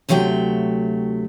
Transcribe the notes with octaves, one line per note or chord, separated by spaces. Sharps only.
D2 C3 F#3 A3 G5